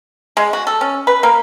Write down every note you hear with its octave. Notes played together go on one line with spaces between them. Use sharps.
G#3
F#4
A4
C#4
B4
A#3